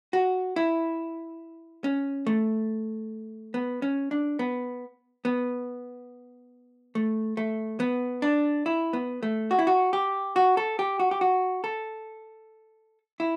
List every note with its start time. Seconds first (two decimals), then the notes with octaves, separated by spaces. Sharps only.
0.13 F#4
0.56 E4
1.84 C#4
2.26 A3
3.54 B3
3.82 C#4
4.11 D4
4.39 B3
5.25 B3
6.95 A3
7.37 A3
7.80 B3
8.22 D4
8.66 E4
8.93 B3
9.23 A3
9.51 F#4
9.59 E4
9.67 F#4
9.93 G4
10.36 F#4
10.57 A4
10.79 G4
11.00 F#4
11.11 G4
11.21 F#4
11.64 A4
13.20 E4